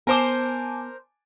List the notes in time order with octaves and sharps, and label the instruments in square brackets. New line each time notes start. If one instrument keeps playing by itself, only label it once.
[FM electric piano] B3 [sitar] A#4 C5 [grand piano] G#5 A5 D6